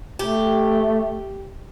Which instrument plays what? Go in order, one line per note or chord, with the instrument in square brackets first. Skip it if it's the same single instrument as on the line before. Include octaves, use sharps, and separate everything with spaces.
[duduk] A3 [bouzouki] G4